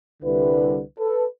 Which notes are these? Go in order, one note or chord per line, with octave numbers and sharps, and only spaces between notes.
C2 D3 G3 E4 B4
A4 B4